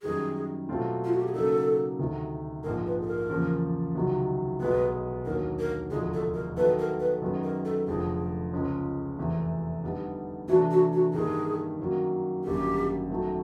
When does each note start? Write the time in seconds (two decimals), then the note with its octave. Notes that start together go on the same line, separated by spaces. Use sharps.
0.02 F#2 D#3 G3 G#4
0.69 B2 F#3 A3 C4 F4
1.04 F4
1.12 F#4
1.19 G4
1.27 G#4
1.33 C#3 F#3 A#3 D#4 A4
1.99 D2 C3 D#3
2.64 A#1 G#2 F3 G#3 A#4
2.86 B4
3.02 A4
3.07 A#4
3.29 E2 C#3 F3 A#3
3.95 C#2 C3 D#3 F#3
4.60 B1 B2 G#3 B3 B4
5.26 D#2 D3 F#3 A#3 D#4 A#4
5.59 A#4
5.91 E1 D2 C3 F3 G#3 G#4
6.14 A4
6.34 A#4
6.57 D#3 F#3 B3 E4 A4 B4
6.79 A#4
7.00 B4
7.22 F#2 D#3 G#3 B3
7.44 A#4
7.65 A4
7.87 F1 F2 D3 F3 G#4
8.52 C#2 C#3 F3 G#3 C#4
9.18 F1 E2 C3 E3
9.83 D3 G3 B3 D#4
10.48 C3 E3 A3 D4 F#4
10.71 F#4
10.93 F#4
11.13 G2 D#3 G3 A#3 D#4 G#4
11.79 F#2 D#3 F#3 A#3
12.44 G#1 F#2 D3 G3 A#3 G4
13.10 F#2 D#3 F#3 A3